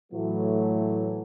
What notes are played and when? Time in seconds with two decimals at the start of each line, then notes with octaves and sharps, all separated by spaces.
0.12 A2 E3 F#3 A3